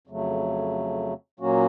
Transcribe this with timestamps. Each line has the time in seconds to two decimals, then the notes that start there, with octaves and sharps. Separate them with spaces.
0.07 F2 C#3 F#3 A3
1.40 A#2 F#3 A#3 C#4 F#4